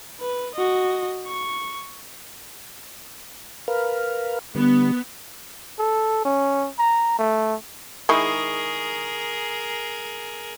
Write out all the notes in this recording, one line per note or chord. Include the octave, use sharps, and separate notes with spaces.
B4
F#4 D#5
C#6
A#4 B4 F5
D3 G3 B3
A4
C#4
A#5
A3
D#3 G#3 E4 G#4 A#4 C#6 D#6 C7